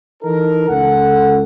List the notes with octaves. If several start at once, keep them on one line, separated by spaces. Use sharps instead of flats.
E3 D#4 A4 A#4
C#2 A4 F#5